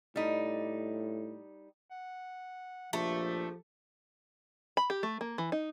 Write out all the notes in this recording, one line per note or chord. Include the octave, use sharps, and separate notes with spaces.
A2 G3 D#4
F#5
A#1 F3 A3 G4
B5
G4
A3
A#3
E3
D#4